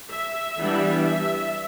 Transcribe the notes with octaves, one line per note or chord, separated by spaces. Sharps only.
E5
E3 G3 B3 D4
E5